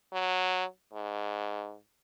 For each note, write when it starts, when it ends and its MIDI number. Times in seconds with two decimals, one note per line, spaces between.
0.13 0.64 54
0.93 1.75 44